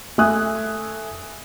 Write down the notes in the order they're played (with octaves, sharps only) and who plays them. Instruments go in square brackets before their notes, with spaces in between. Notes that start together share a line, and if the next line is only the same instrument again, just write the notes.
[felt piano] A3 E5 G#5 D#6 F#6